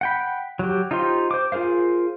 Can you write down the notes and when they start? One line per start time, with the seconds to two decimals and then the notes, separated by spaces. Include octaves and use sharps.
0.01 F#5 G5 B5
0.59 F#3 G4
0.91 D#4 F4 G4 C5 C6
1.31 C5 D6
1.52 F4 G#4 A#4 C5 F5